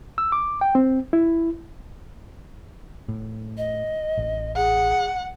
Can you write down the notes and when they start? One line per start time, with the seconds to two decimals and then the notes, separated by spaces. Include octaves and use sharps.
0.18 E6
0.32 D6
0.61 G5
0.75 C4
1.13 E4
3.09 A2
3.57 D#5
4.17 A1
4.56 G#4 F#5